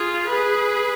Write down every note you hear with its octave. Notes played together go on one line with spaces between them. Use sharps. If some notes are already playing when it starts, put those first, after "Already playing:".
Already playing: F4 G#4
G#4 B4